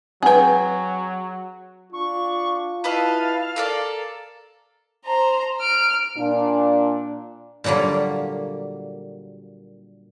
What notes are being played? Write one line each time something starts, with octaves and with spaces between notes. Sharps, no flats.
F#3 C4 G#4 B4 F#5 G5
D4 F4 C#6
E4 B4 D#5 F5 A5
A4 A#4 D5
C5 A#5
F6 D7
A#2 D4
A#2 D3 F#3 G3 A#3